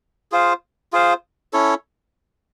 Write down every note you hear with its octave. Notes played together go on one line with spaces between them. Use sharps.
F4 G#4 C5 F5
F4 G#4 C5 F5
C#4 E4 A4 C#5